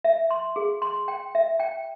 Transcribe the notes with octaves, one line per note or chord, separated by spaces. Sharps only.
E5
C6
G#4
C6
G5
E5
G5